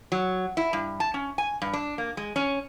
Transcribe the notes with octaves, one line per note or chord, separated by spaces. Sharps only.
F#3
E4
G2
A5
C#4
G#5
G2
D4
A#3
G#3
C#4